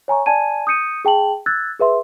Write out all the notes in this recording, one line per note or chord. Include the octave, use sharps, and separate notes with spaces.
C#5 G#5 A#5 C#6
D5 G#5 A5 G#6 D#7
D#6 G6 C#7 D#7
G#4 G5 A5 F#7
E6 F#6 G#6 A6
G#4 B4 E5 C6